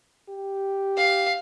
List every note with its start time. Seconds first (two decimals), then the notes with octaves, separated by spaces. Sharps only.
0.29 G4
0.98 F5